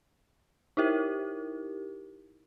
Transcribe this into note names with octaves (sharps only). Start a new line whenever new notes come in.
D#4 E4 G4 A#4